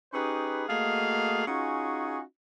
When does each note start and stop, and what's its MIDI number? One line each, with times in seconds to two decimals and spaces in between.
0.14 0.65 61
0.14 0.65 63
0.14 0.65 67
0.14 0.65 68
0.14 0.65 71
0.69 1.47 57
0.69 1.47 58
0.69 1.47 66
0.69 1.47 68
0.69 1.47 75
0.69 1.47 77
1.47 2.21 61
1.47 2.21 63
1.47 2.21 65
1.47 2.21 66
1.47 2.21 68